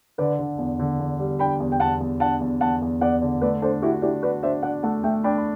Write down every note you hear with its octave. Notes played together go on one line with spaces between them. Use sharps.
D3 B4 D5
D3
E2
D3
E2
G3
D4 G5 B5
E2
G5
E2 F#5 A5
E2
D4 F#5 A5
E2
E2 F#5 A5
E2
E2 D5 F#5
D3
A3 B4 D5
D4 A4 C5
E4 F#4 G4
D4 E4 G4
F#4 B4 D5
D4 C5 E5
D4 D5 F#5
A3 F#5 A5
A3 E5 G5
D4 G5 B5
B5